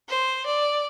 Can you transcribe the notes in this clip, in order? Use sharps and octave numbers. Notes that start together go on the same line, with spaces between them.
C5
D5